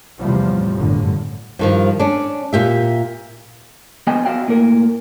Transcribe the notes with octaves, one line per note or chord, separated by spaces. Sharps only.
E2 A2 C3 F3 G3
G1 F#2 A2 D3
G2 D#3 F3
C#4 D4
A#2 G4 E5
B3 C5 D#5 G5 G#5
F#4 D5 E5 F5 G5
A2 A#3 A#4